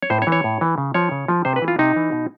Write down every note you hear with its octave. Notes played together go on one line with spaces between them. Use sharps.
C#5
A2 C5
C#5
E3
C#5
A2
E3
C#3
F3 C#5
C#3
F3
C3 C5
B4
E3
F4
C3 D#4
E3
B2